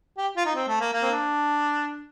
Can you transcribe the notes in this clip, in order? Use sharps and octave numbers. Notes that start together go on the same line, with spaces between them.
G4
F4
D#4
C4
A3
A#3
A#3
C4
D4